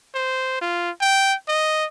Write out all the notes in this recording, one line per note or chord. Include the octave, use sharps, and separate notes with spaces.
C5
F4
G5
D#5